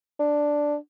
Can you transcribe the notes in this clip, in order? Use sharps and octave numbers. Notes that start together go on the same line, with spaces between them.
D4